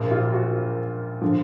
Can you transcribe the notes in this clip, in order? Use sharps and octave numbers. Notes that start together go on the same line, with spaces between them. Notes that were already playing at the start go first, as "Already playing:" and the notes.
Already playing: A#1 A#2 F3
F4
F#4
D3 F3